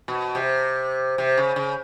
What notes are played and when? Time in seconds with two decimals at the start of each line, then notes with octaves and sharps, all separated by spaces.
0.08 B2
0.35 C3
1.18 C3
1.38 C#3
1.56 C#3